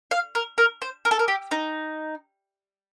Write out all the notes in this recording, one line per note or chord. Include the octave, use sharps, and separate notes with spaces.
F5
A#4
A#4
C5
A#4
A4
A#4
G4
D#4